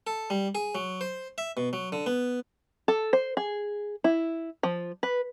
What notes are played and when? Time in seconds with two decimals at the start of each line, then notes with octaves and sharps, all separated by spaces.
0.07 A4
0.30 G3
0.55 G#4
0.75 F#3
1.01 C5
1.38 E5
1.57 B2
1.73 F#3
1.92 D3
2.06 B3
2.88 A4
3.13 C5
3.37 G#4
4.04 E4
4.63 F3
5.03 B4